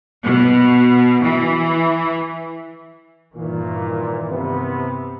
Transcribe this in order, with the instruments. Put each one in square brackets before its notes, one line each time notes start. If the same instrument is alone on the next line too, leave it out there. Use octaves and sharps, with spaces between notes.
[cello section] B2
E3
[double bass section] G2 D#3 E3 [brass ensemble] A#2
[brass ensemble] C3 B3